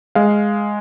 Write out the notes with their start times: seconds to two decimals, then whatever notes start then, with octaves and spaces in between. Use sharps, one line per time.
0.15 G#3 F5